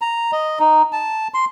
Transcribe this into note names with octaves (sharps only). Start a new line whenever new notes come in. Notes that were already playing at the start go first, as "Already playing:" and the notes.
A#5
D#5
D#4
A5
C6